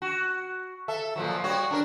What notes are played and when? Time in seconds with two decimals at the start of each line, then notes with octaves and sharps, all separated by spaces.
0.02 F#4
0.88 A4 E5
1.16 A#2 F3 F#3
1.44 G3 F#4 C#5
1.71 D4 A#4